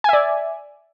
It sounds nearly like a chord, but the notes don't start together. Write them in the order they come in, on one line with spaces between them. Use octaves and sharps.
G#5 E5 D5